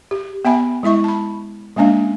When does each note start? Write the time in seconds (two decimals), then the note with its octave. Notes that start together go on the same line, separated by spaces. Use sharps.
0.11 G4
0.45 B3 E5 G#5 B5
0.83 G#3 E4 E5 C#6
1.04 A5 B5
1.76 G#3 A#3 C#4 D4 F5